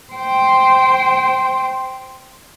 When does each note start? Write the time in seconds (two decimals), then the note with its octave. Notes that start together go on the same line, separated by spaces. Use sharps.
0.13 C5 G5